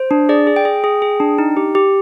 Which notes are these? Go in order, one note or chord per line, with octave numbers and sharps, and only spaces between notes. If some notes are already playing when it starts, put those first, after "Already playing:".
Already playing: C5
D4
G#4 D5
G#4
G5
G#4
G#4
G#4
D4
D#4
G4
G4